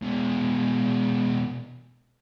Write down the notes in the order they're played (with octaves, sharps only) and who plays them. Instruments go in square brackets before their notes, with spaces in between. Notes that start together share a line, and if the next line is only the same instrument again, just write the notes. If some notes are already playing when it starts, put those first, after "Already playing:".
[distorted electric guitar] B2 G#3